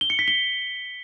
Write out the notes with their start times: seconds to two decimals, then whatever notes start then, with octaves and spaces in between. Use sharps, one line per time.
0.01 G7
0.10 C#7
0.19 B6
0.28 G7